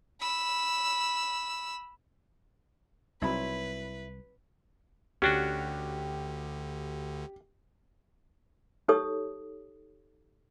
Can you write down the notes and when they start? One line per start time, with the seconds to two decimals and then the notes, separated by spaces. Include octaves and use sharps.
0.20 B5 E6
3.22 C2 F#3 C4 D#4 E4 B4 B5
5.22 D2 D3 C#4 D4 F#4 G4
8.88 D#4 G4 A4 C#5 D#6